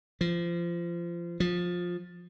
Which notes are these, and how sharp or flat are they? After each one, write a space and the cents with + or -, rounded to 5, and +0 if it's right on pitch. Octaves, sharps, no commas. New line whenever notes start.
F3 -25
F3 +15